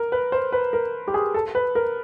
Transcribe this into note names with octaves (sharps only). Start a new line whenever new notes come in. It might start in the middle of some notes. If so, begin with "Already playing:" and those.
Already playing: A#4
B4
C5
B4
A#4
G4
G#4
A4
B4
A#4